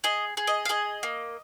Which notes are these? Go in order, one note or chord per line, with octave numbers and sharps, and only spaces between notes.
G#4 D#5
G#4
D#5
F5
G#4 D#5
A#3